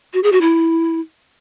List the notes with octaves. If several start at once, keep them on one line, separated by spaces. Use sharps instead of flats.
F#4
G#4
F#4
E4